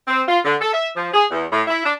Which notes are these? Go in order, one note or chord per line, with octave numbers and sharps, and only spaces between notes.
C4
F4
D3
A4
E5
F3
G#4
E2
A2
E4
D4